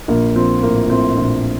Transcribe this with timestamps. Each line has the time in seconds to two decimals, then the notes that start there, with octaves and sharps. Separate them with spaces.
0.08 A#1 A#3
0.36 F3 C4
0.62 A2 A#3
0.90 A2 C4
1.17 A#1